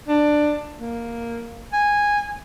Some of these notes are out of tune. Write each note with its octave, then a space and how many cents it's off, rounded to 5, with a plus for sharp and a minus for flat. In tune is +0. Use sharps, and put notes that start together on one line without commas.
D4 +15
A#3 +0
G#5 -10